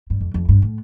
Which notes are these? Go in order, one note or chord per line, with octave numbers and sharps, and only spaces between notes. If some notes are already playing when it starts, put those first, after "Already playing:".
G2
F2
F2
G2
A2